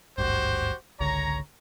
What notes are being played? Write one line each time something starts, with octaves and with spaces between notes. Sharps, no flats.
G#1 D2 G2 F#4 G4 C5
G#1 C#2 D3 C#5 A#5